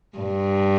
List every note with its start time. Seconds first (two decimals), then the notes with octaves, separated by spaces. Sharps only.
0.18 G2